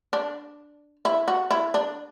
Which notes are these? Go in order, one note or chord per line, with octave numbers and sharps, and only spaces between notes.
D4
E4
F#4
E4
D4